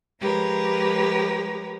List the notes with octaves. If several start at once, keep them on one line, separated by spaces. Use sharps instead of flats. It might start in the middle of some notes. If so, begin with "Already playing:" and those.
F3 G#3 G4 A#4 B4 C#5